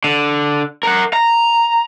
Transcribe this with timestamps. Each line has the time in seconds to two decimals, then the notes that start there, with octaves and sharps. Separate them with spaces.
0.04 D3
0.83 A#4 F#5
1.13 A#5